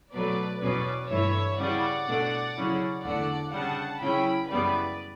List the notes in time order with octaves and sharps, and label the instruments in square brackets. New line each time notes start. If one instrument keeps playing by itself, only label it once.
[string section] B2 F#3 A3 B4 D5
E2 B2 F#3 C#4 B4 D5
G2 E3 A3 E4 C#5 E5
C#3 E3 G3 C#4 E4 D5 F#5
B2 A3 D4
C#3 F#3 C#4 E4
E2 D3 A3 D5 F#5
C#3 G3 D4 F#5 A5
C#3 F#3 C#4 E4 G5 B5
F#2 C#3 E3 G3 B3 B4 D5